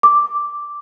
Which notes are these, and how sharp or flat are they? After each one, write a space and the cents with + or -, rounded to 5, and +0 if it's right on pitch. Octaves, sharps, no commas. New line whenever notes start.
D6 +0